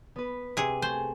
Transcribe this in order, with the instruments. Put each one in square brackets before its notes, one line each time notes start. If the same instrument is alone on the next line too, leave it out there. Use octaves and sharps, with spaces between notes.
[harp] B3 B4
[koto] C3 G#4
[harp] A3 G#4 [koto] C5